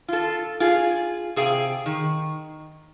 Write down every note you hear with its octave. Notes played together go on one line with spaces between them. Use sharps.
F4 A4
F4 G#4
C3 G#4 F5 G5
D#3